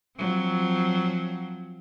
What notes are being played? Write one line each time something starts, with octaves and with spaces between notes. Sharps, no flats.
F3 F#3 C4